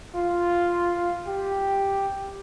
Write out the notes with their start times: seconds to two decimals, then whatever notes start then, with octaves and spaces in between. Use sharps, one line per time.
0.15 F4
1.27 G4